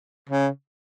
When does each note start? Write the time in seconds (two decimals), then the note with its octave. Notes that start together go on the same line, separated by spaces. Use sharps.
0.29 C#3